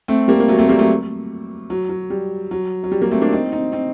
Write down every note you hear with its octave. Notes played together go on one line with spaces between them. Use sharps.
A3 C4
G3 A#3
A#3
F#3 A3
A3 C4
G3 A#3
F#3 A3
F#3
F#3
G3
F#3
F#3
G3
G3 A#3
A3 C4
A#3 D4
C4 D#4
C4 D#4
C4 D#4